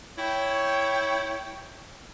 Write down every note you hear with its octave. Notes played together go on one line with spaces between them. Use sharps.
E4 C#5 G5